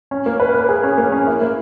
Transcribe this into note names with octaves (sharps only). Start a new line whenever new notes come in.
C#4
A#3
B4
B4
G#4
C#4
A#3
C#4
E4
A#3